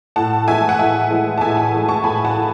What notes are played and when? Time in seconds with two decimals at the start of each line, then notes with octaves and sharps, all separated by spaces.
0.16 A2 F#5 A5
0.48 E3 G#3 E5 G#5
0.69 F#5
0.79 A2 E5 G#5
1.10 E3 G#3
1.38 A5
1.41 A2 E5 G#5
1.57 F#5 A5
1.73 E3 G#3
1.88 A5 C#6
2.03 A2 G#5 B5
2.25 F#5 A5
2.35 E3